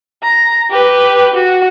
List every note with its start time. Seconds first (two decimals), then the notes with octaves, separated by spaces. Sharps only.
0.23 A#5
0.71 G4 B4
1.34 F#4